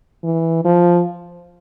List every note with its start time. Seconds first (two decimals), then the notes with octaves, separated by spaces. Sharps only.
0.23 E3
0.65 F3